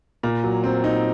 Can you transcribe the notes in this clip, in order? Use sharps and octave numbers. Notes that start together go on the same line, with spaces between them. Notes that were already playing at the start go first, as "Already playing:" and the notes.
A#2
F#3
C4
D#4